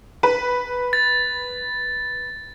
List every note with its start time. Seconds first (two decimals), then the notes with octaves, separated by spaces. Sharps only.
0.23 B4
0.93 A6